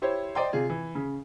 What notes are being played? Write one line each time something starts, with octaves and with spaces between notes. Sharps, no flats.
E4 G4 C5 C#5
C5 D5 D#5 G5 A#5 C6
C3 F4 G#4
E3
C#3